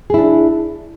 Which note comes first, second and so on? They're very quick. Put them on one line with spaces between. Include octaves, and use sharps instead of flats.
G#4 E4 D4